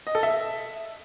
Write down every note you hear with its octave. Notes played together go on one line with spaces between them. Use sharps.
D#5
A4
E5